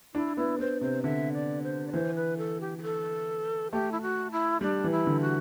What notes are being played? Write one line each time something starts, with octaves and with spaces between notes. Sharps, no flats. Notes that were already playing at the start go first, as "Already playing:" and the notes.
D4 E4
B3 E4
B3 C5
C3 C5
D3 E5
D5
C5
D5
E3 C5
B4
A4
G4
G4
A4
A3 G4
E4
F#4
E4
G3 D4
E3
E4
D3
F#4